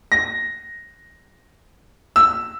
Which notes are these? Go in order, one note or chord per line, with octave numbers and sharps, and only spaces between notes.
A#6
E6